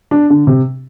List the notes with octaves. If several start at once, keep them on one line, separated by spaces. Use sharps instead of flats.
D4
D3
C3